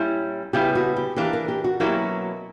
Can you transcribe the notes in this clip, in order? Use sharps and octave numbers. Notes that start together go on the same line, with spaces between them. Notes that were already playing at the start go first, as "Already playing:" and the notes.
Already playing: A#2 G3 C#4 E4
C#3 G3 B3 E4 G4
F#4
G4
E3 A#3 D4 G4
A#4
G4
F#4
B2 F#3 A#3 C#4 E4 G4